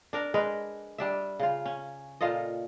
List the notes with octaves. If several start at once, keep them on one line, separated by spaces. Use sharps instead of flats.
D4 A#4
G#3 A#4 B4
G3 D4 E5
C#3 F4
C#4
A#2 F4 A4 D#5